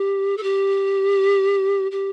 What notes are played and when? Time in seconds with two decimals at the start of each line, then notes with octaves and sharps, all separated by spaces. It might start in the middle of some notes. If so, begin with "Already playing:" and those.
Already playing: G4
0.37 A4
0.43 G4
1.91 G4